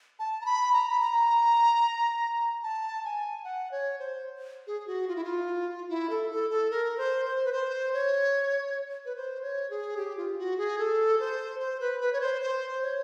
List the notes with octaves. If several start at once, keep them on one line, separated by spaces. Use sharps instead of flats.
A5
A#5
B5
A#5
B5
A#5
A5
G#5
F#5
C#5
C5
G#4
F#4
F4
E4
F4
E4
A4
A4
A4
A#4
C5
C5
B4
C5
C#5
B4
C5
C#5
G#4
G4
F4
F#4
G#4
A4
C5
C5
B4
B4
C#5
C5
C5
C#5